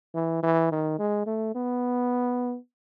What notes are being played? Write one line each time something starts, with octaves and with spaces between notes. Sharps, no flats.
E3
E3
D#3
G#3
A3
B3